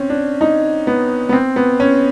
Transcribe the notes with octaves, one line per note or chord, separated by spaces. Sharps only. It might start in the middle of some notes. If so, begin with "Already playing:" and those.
Already playing: C4 C#4
D4
D#4
B3
B3
C4
B3
C#4